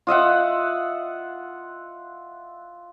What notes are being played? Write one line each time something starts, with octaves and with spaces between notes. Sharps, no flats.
F4 D#5 E5 F#5